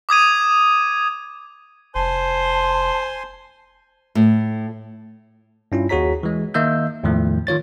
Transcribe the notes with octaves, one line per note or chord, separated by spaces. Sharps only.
D6 D#6 G#6 D#7
F1 C5 G#5 A5 C6
A2
G2 C#4 E4 F4
D#2 F#4 G#4 C#5 A#5 B6
E3 G#3
D#3 A#3 D#5 E5 E6 G6
E2 A2 D#3 F3 A3
D#3 F4 C#5 A6